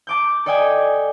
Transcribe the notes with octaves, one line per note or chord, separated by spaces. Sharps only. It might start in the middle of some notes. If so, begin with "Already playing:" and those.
A5 D6 G6
A4 D5 D#5 G5 G#5